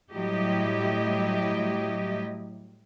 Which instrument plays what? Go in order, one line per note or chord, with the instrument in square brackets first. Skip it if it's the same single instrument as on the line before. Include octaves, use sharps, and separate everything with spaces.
[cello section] A2 F#3 G3 E4 G4 D#5